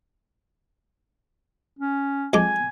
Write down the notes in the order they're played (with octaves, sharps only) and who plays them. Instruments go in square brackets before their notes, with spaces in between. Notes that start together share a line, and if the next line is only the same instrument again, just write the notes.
[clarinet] C#4
[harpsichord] F2 G#3 D6 [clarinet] G#5